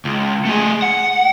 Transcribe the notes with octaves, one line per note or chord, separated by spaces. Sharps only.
C#2
A3 G#4
F#5